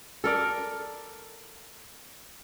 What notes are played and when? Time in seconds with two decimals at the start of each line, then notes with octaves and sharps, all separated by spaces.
0.24 A4 A#4 D5